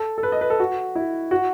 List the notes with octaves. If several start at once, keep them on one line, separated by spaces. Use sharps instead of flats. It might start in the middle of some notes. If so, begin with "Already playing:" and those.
Already playing: A4
A4
B4
D#5
B4
A4
F#4
E4
F#4